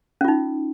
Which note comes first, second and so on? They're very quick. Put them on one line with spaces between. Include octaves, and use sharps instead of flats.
C#4 F4 D#4